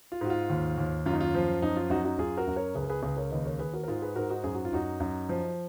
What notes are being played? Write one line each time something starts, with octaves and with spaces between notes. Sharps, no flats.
F4
G#2 F#4
F4
D#2
D#2
F#2 F4
D#4
F4
F3
F#2 D#4
F4
F#2 D#4 F#4
D#4 F#4
F#2 F4 G#4
F#4 A#4
F#2
A#4 C#5
C#2 G#4 B4
A#4
G#4 B4
C#2 G#4 B4
A#4 C#5
D#2 B4 D#5
A#4 C#5
D#2 G#4 B4
F#4 A#4
A#4
G#2 F4 G#4
G#4 B4
G#2 F#4 A#4
D#4 F#4
F#2 G#4
F#4
F4
F#2 D#4 F#4
F#2
F3